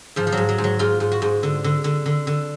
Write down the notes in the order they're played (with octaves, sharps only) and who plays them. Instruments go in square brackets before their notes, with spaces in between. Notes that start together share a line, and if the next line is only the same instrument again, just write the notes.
[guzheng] G#2 F3
F3
G#2 F#3
F#3
G#2
F#3
G#2 F4
G#2
F#4
G#2
D3
D3
D3
D3
D3